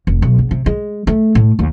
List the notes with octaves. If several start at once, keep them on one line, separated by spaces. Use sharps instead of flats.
F1
B1
F#1
C3
G#3
A3
A2
D#2